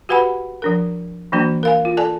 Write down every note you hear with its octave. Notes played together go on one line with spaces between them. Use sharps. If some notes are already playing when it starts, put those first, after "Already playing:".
F#4 G4 B4 F#5 G#5 B5
F3 D4 A#4
E3 F#3 A#3 D4 F#4
A#4 F5 G#5
F4
A4 D5 G#5 A5